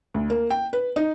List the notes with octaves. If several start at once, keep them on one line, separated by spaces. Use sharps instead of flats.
D2
A#3
G5
B4
D#4